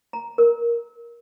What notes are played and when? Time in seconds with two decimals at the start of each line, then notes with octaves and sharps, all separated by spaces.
0.13 A#5
0.38 A#4